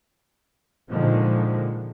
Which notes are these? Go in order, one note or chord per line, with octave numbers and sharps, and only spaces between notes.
A#2 D3 D#3 F3 G#3